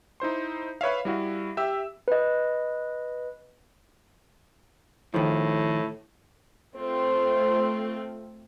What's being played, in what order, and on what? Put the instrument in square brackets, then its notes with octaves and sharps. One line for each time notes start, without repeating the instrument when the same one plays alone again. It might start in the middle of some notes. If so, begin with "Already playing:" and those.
[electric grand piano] D#4 E4 C5 C6
B4 C#5 E5 F5
G3 E4 F#4 F5
G4 E5 E6
[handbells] B4 D#5
[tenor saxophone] A2 [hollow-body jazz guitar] D#3 F3
[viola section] A3 C4 F4 [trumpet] C5